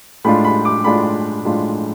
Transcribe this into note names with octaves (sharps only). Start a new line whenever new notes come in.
A2 G#3 D4 F4 B5
B5
D6
A2 G#3 D4 F4 B5
A2 G#3 D4 F4